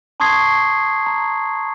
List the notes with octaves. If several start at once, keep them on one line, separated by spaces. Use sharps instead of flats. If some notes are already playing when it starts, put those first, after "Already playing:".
A5 C6 C#6 D#6 G#6 C7
A#5